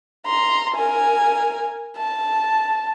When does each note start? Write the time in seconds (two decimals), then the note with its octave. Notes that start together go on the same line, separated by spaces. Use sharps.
0.26 A#5 C6
0.75 A#4 G#5
1.97 A5